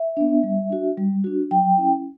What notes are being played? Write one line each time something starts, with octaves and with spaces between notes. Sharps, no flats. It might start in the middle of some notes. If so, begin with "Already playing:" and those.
Already playing: E5
B3 D4
G3
D4 F#4
G3
D4 F#4
F#3 G5
C#4 E4